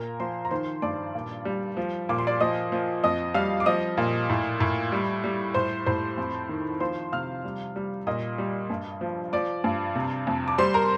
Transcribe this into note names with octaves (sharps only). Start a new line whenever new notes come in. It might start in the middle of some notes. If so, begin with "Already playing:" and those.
Already playing: A#2 A#4 A#5
F3 C5 C6
A#5
D#3 C5 C6
G2 D5 D6
A#2
G3
F3
A#2 D6
C6
D5 D6
F3 D#5 D#6
F3
F2 D#5 D#6
G3 F5 F6
D6
F3 D#5 D#6
A#2
A2
A2
G3
G3
A2 C5 C6
A2 C5 C6
F2
D#3
F3 C5 C6
C3 F5 F6
G3
G3
A#2 D#5 D#6
G3
G2
F3
F3 D5 D6
G2
C3
F2
D6
G3 C5 C6
A#4 A#5